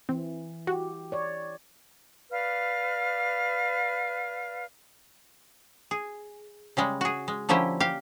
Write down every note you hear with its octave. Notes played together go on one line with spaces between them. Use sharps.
E3 C4
F#4 G4
C#5 D5
B4 D5 F5 F6
G#4
C#3 G3 G#3
F#4 G#4
G#3
D3 F3 A#3 C#4 E4 G4
G4 F5